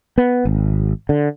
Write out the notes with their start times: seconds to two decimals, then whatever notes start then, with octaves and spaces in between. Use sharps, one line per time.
0.18 B3
0.45 G#1
1.09 D3